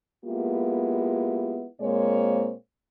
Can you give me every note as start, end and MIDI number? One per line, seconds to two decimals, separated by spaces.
0.25 1.65 56
0.25 1.65 58
0.25 1.65 59
0.25 1.65 64
0.25 1.65 65
0.25 1.65 67
1.81 2.53 46
1.81 2.53 56
1.81 2.53 58
1.81 2.53 60
1.81 2.53 72
1.81 2.53 73